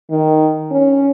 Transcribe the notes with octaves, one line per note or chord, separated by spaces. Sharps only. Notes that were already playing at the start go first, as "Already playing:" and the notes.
D#3
C#4